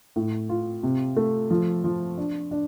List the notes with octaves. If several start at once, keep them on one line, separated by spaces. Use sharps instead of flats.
A2
F4
C3
A3
F3
F3
D4
D4